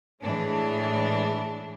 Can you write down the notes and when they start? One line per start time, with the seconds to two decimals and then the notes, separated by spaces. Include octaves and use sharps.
0.22 A2 E3 G#3 D4